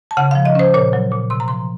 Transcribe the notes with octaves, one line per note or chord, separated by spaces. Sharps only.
A5
C#3 F#5
F3 F5
D#5
C#4 C5
A#2 C#5
F#3
A#2
C3 C6
A#5
F3 C6